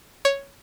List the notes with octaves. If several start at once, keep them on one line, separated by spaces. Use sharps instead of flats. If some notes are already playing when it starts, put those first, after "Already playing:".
C#5